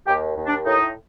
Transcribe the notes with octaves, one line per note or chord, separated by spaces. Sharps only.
D#2 G4
D#2
D4
A2 D#4